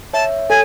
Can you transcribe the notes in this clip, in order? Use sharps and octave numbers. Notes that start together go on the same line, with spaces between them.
C#5 E5 A5
A4 C#5 G#5